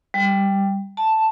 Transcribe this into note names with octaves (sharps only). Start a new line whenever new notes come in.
G3
A5